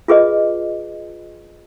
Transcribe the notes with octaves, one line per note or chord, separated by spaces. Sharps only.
F4 G#4 B4 D#5